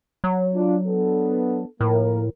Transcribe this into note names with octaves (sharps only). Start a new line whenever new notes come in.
F#3
D4 F4
B3 D4 A4
A2 F3 A#3 A#4